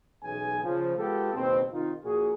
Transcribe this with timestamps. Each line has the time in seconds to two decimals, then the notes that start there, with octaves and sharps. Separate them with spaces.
0.23 B1 E3 C#4 G#4 G#5
0.64 C#3 F3
0.97 G#3 B3 F4 G4 A4
1.33 F#1 D#2 B2 C4
1.72 C3 D#3 D#4 F4
2.04 A#1 A#2 F#4 G#4